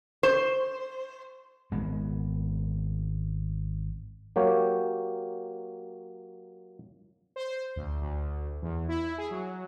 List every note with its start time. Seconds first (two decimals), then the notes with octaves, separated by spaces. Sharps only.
0.23 C5
1.71 G#1 G#3 B3
4.36 F#3 A#3 G4 C#5
7.36 C5
7.76 D2
8.01 D2
8.62 E2
8.89 E4
9.18 G#4
9.31 F#3